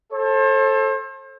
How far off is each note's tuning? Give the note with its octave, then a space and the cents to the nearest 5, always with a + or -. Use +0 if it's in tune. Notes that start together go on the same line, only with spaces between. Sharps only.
A4 +0 C5 +40